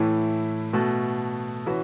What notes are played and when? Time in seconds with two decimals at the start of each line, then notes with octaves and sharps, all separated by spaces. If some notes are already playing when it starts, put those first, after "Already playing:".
Already playing: A2 E3 A3 E4
0.73 B2 A3 F#4 A4
1.66 E3 C#4 F#4 B4